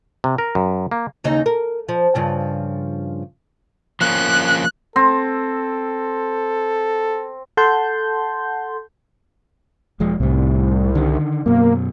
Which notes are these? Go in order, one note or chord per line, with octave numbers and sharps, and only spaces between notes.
C3
A#4
F#2
A#3
D#2 C#3 D#4
A#4
F3
G2 C#3 F3
F3 A#3 C#4 F#6
C4 A4
A4 F#5 A5 C6 G6
E1 F3 G#3
C2 A2 G3
D3 D#3
F#2 B2 A#3